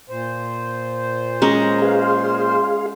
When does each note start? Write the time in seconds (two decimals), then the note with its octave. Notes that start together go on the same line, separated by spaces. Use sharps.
0.09 A#2 C5
1.42 G#3 C#4 A#5
1.82 G#4 B4 F5
2.05 C6